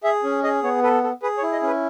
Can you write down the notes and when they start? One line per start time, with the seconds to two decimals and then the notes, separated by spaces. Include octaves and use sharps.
0.03 G#4 E5
0.24 C#4
0.43 G#4 D#5
0.63 B3 C#5
0.83 A4 B4
1.03 A4
1.23 G#4 B4
1.38 C#5
1.43 E4
1.52 D#5
1.62 C#4 B4